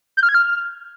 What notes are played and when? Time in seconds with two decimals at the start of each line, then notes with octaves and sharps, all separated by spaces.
0.17 G6
0.23 F6
0.29 G#6
0.34 F6